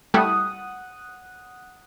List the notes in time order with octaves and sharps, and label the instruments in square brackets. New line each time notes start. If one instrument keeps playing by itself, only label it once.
[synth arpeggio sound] G3 A3 E4 [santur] F#5 D#6